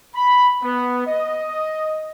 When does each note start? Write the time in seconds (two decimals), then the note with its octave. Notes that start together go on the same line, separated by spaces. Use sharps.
0.15 B5
0.62 B3
1.06 D#5